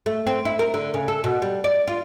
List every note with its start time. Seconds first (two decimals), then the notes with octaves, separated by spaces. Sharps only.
0.06 A3
0.27 C4
0.45 E4
0.59 A#4
0.74 D3
0.94 C#3
1.08 A4
1.24 B2
1.42 G3
1.64 D5
1.87 F4